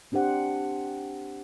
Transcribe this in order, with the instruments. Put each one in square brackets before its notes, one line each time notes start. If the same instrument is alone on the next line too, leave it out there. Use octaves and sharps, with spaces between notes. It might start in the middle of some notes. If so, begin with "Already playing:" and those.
[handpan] C4 D4 G4 C5 F#5